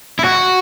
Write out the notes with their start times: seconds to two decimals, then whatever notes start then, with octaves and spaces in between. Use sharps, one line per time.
0.19 E4
0.24 F#4